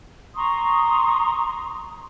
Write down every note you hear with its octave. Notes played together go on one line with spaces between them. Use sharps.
A#5 C6 C#6 D#6